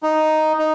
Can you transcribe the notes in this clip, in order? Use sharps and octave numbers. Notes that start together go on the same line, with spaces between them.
D#4
D#4